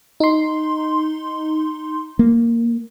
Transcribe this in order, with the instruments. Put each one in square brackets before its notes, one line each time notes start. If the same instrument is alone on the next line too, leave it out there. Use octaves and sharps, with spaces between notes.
[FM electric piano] D#4 C6
[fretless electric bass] A#3